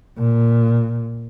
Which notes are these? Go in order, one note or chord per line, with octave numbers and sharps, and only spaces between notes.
A#2